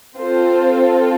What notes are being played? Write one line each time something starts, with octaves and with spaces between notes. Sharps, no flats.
C4 F4 A4 C5